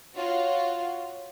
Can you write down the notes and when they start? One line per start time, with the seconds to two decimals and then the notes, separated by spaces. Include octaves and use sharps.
0.14 F4 F#4 C#5